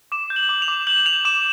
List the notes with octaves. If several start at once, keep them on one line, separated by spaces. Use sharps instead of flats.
D6 E7
G6
F#7
D6
F7
D6
G6 F#7
G6 F7
D6 E7